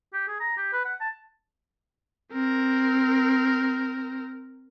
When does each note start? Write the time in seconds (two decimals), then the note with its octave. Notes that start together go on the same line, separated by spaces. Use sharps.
0.13 G4
0.28 G#4
0.40 A#5
0.57 G4
0.73 B4
0.85 F#5
1.01 A5
2.32 C4 A#4